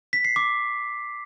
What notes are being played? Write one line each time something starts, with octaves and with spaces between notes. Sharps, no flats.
B6
C7
D6